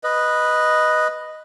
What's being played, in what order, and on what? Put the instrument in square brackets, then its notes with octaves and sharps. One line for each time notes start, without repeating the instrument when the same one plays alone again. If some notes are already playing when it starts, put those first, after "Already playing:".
[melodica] B4 D#5